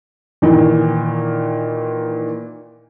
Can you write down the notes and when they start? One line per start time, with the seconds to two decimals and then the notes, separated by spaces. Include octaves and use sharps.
0.42 A#2 D#3 E3